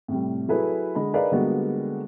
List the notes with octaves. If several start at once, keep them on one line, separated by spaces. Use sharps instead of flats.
A2 C3 G3
F#3 E4 G#4 A4 B4
D3 G#3 D#5 B5
D#4 G#4 A#4 B4 D5 F5
D3 G3 G#3 A#3 B3 F#4